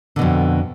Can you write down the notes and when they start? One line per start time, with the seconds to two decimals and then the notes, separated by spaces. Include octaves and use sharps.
0.16 D3
0.19 B2
0.22 F2